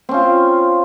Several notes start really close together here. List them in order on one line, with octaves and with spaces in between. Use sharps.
C4 C#4 F4